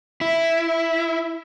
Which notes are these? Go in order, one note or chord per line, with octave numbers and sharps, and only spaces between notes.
E4